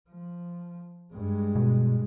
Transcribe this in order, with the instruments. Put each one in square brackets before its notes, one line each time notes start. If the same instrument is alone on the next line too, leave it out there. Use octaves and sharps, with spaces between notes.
[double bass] F3
G2 G#3
[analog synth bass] B2